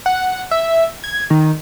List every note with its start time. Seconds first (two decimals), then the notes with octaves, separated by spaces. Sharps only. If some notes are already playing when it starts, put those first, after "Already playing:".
0.06 F#5
0.51 E5
1.04 G#6
1.30 D#3